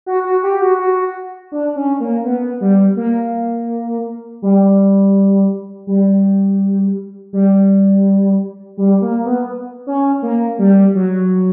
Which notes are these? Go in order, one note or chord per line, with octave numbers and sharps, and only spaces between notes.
F#4
F#4
G4
F#4
F#4
D4
C#4
A#3
B3
G3
A#3
G3
G3
G3
G3
A#3
B3
C#4
A#3
G3
F#3